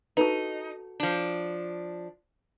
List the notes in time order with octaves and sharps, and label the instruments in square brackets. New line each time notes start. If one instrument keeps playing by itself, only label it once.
[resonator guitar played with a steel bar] D#4 [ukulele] F#4 A4 B4
[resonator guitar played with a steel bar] F3 D4